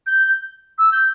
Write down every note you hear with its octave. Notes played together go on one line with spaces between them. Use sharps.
G6
E6
G6